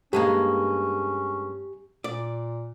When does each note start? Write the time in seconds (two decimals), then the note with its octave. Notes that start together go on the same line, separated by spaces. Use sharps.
0.13 G2 G#3 A#3 C#4 G4
2.04 A#2 D5